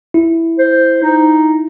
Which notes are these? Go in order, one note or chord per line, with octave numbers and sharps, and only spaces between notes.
E4
C5
D#4